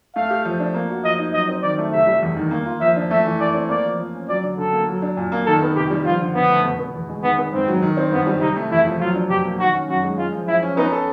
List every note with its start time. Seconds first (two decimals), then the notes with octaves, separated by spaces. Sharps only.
0.16 A3 F5
0.30 G4
0.45 F3
0.60 D4
0.74 A#3
0.89 F#4
1.04 F3 D#5
1.18 D#4
1.33 F#3 D#5
1.48 C4
1.63 D#3 D5
1.78 A3
1.92 C3 E5
2.07 G3
2.22 E2
2.36 D#3
2.51 A#3
2.66 F4
2.81 F3 E5
2.96 D4
3.11 A3 E5
3.26 E3
3.40 E3 D5
3.54 C4
3.69 A#3 D5
3.84 F3
3.98 F3
4.14 C#4
4.29 F#3 D5
4.43 D3
4.58 D3 A4
4.72 A#3
4.88 F#3
5.02 D4
5.17 A#2
5.32 A#3
5.46 D#3 A4
5.62 B3
5.76 C3 G4
5.90 G3
6.05 F3 F4
6.21 D3
6.35 D3 B3
6.50 A3
6.64 B2
6.79 B3
6.94 E2
7.09 G#3
7.23 D#3 B3
7.38 B3
7.53 G#2 C4
7.68 F#3
7.82 D#3
7.97 C4
8.11 G2 B3
8.27 G3
8.41 C3 D#4
8.56 A3
8.70 E2 E4
8.85 F3
9.00 F#3 F4
9.15 D4
9.30 B2 G4
9.45 A#3
9.59 D#3 F#4
9.74 C#4
9.88 F#2 F#4
10.03 G#3
10.18 G#3 F4
10.32 F3
10.47 F3 E4
10.62 C#4
10.77 B3 D#4
10.92 A4